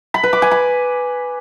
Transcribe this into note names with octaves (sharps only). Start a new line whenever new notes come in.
B5
B4
D6
G#5
B5